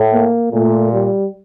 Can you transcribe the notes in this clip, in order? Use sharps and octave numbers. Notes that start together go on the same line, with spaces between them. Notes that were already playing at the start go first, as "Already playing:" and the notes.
Already playing: A2
A#3
A#2 A3
G3